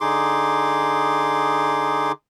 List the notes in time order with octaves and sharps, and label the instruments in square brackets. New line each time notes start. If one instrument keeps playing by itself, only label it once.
[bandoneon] D3 D#4 G#4 C6 D6